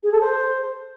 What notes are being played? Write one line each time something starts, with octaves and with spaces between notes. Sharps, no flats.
G#4
A4
C5